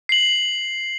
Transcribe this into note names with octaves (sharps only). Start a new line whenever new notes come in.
C7 F#7